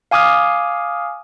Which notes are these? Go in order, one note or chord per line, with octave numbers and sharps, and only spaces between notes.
F5 G#5 D6 D#6 F6